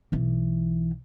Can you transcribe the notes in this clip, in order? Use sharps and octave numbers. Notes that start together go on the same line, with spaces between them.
B1 E3